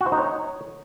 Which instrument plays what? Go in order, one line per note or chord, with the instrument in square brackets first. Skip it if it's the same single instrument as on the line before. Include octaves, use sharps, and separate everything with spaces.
[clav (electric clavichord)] F#4
C5
D#4
C#5